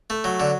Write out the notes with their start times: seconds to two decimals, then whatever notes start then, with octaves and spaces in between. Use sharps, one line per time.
0.10 A3
0.24 F#3
0.40 D3